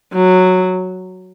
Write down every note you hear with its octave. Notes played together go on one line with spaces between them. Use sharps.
F#3